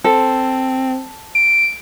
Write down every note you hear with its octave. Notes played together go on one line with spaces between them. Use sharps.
C4 A4
D7